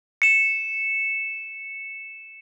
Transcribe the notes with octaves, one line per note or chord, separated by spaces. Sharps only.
C#7 E7